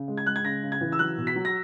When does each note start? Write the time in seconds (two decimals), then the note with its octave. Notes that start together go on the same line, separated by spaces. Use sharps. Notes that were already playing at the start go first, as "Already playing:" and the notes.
Already playing: C#3
0.08 G#3
0.17 G#6
0.26 G#3 F#6
0.36 G#6
0.45 C#3 A#6
0.63 C#3
0.72 G#6
0.81 E3
0.92 E6
0.99 F#3 F#6
1.17 B2
1.27 B6
1.36 F#3
1.45 A#6